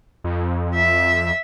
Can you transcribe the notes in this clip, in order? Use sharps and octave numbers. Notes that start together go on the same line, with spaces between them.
F2
E5